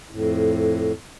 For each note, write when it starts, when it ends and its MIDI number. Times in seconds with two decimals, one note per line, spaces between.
0.11 0.92 41
0.11 0.92 45